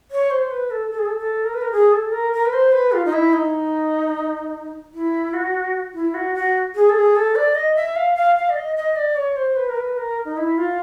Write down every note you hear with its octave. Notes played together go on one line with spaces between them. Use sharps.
C#5
C5
B4
A4
A4
G#4
A4
A4
A#4
B4
A#4
G#4
A4
A#4
A#4
B4
C5
B4
F4
D#4
E4
D#4
E4
F#4
E4
F#4
F#4
G#4
A4
G#4
A4
D5
D#5
E5
F5
F5
F5
D5
D#5
D#5
D5
C#5
C5
B4
A#4
B4
A#4
D#4
E4
F4